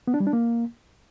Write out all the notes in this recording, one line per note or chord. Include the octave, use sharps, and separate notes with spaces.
B3
D4
G3
D4
A#3